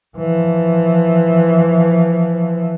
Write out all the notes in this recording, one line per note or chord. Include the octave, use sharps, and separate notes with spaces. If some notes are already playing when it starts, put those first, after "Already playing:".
E3 F3